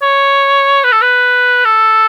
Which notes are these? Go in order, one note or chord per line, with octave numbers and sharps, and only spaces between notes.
C#5
B4
A4
B4
A4